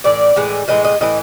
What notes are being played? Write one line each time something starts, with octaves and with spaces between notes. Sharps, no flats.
A2 E3 D5
A2 E3 G#3
A2 E3 G#3 D#5
D#5
A2 E3 D#5